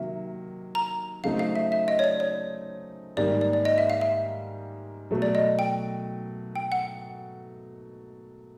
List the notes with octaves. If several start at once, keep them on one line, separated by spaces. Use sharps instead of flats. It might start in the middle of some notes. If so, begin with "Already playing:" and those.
Already playing: C3 D#3 F#3 A#3 E5
A#5
C#3 F#3 A3 C4 D#4 F5
F5
E5
E5
D#5
C#5
D5
C#5
G#2 D#3 G3 A#3 D5
D5
D5
D#5
E5
F5
E5
B2 F#3 A3
D5
D#5
G5
G5
F#5